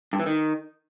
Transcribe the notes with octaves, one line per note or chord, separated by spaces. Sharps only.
G2
E3
D#3